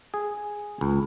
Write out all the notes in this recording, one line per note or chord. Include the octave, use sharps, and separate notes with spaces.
G#4
C#2